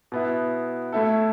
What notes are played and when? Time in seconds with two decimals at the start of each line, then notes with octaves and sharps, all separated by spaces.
0.12 B2 B3 E4
0.92 A2 A3 E4 A4